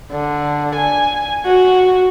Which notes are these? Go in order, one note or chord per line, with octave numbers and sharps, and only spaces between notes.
D3
G#5
F#4